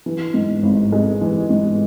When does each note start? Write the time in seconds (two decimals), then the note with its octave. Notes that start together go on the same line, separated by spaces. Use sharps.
0.06 E3
0.34 G#2
0.63 G#1
0.92 G#3
1.21 E3
1.50 G#2